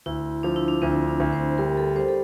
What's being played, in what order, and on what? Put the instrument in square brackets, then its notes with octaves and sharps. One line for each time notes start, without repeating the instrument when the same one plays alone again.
[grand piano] D2 [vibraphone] E4
[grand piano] F3 [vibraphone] D4
[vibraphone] E4
D4
[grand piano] D2 [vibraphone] C4
[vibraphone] D4
[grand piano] D2
[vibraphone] C5
[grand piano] G3 [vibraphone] A#4
[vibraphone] A4
[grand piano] G3 [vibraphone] C5
[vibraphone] A4